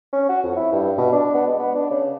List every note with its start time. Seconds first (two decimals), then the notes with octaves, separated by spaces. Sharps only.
0.12 C#4
0.29 F#4
0.43 F2
0.56 E4
0.72 G2
0.98 B2
1.12 D4
1.34 B3
1.47 G#3
1.59 B3
1.75 D4
1.90 C#3